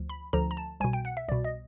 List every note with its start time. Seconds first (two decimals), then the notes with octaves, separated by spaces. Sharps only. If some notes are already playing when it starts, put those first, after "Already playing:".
Already playing: D2 F3
0.09 B5
0.33 D2 D3 F3 A#5
0.51 A#5
0.57 A5
0.80 C2 G#5
0.84 B2
0.93 G5
1.05 F#5
1.17 E5
1.28 C2 B2 D5
1.44 D#5